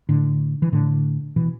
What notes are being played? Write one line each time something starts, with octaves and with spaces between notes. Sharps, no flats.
A2 D3
E3
A2 D3
B2 E3